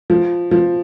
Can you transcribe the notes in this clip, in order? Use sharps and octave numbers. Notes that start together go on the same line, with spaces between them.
F3
F3